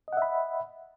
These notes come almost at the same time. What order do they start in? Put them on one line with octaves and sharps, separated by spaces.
D#5 F#5 E5 B5